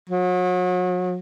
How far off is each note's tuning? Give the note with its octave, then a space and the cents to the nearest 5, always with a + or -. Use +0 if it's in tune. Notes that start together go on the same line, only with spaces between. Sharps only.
F#3 -35